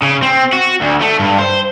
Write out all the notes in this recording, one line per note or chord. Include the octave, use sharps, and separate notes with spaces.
C#3
C4
F#4
D2
A3
G2
C5